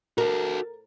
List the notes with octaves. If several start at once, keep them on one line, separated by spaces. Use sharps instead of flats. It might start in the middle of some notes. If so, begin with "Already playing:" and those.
F#4 A4 A#4